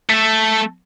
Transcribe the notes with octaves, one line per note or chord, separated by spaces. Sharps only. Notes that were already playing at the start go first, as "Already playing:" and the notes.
A3 A4